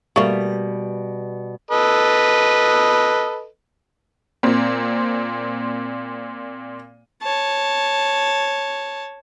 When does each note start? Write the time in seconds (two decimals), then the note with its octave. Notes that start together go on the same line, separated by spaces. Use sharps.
0.16 B2 G3 A3 A#3
1.71 A4 B4 D#5
4.43 A#2 C4
7.22 C#5 A5